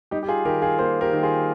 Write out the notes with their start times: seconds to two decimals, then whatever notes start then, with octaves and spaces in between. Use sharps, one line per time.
0.11 G3 D#4 G4
0.23 G4
0.28 F4 G#4
0.45 D#3 G4 A#4
0.62 F4 G#4
0.79 A#3 G#4 C5
1.01 G4 A#4
1.13 D#3
1.23 F4 G#4